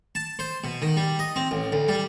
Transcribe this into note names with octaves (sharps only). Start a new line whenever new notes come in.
A5
C5
B2
D#3
G3
D#5
C4
A1
D2
G3